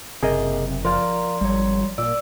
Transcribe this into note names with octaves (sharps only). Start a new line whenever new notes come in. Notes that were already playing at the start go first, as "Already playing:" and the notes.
F#1 C3 G#4 A#4 D#5
F3 A#4 D5 F5 C6
G#1 G3 C#5
A#2 D5 E6